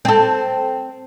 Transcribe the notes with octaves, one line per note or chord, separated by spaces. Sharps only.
C4 A4